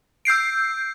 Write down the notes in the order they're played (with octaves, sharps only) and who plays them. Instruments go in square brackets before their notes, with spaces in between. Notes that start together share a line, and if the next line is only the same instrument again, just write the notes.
[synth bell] E6 G6 C7 D7